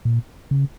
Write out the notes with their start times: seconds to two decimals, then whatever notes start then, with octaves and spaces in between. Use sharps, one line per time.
0.05 A#2
0.51 C#3